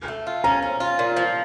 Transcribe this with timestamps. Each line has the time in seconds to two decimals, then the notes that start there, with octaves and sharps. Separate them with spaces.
0.08 A3
0.27 F4
0.44 C#4 A#5
0.62 C#4
0.80 F4
0.99 A#2
1.17 F3